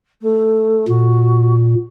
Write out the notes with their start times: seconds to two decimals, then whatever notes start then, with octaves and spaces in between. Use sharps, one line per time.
0.21 A3
0.88 A#2 F#4